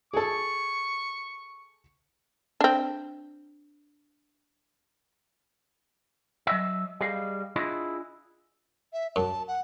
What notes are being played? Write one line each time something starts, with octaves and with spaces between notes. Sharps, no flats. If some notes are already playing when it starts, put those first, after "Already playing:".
G#4 A4 C#6
C4 D4
F#3 D#5 E5
G3 G#4 D#5 F5
D4 E4 F4 G#4 D#5
E5
F#2 A5
F#5